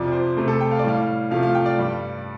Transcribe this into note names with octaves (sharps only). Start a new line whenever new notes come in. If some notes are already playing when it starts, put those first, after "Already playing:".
Already playing: F2 C3 F3 D5
C5
C3 A3 C5
A4
G5
F5
D5
A2 G3 F5
C3 F3 A3 F5
F5
G5
D5
G2 G3